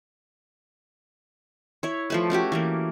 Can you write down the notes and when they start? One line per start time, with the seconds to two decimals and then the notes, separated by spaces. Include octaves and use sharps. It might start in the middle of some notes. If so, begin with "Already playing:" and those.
1.83 E4 C#5
2.10 F3 A3 B4
2.30 A3 C#4 F#4 G4
2.52 E3 A3 A#3